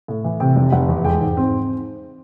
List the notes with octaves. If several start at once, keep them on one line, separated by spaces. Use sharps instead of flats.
A2
E3
C3 G5
F1
F1 F#5
E2
G#3 G5
G#2
C4